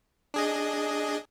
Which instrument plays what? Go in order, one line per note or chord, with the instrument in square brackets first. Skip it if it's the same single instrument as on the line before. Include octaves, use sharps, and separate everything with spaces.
[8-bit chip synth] D4 G#4 D#5